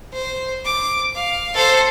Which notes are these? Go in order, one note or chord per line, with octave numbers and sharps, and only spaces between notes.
C5
D6
F5
A4 C5